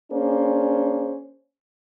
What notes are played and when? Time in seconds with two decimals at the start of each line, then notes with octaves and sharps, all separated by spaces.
0.12 A#3 C#4 D4 G#4 C5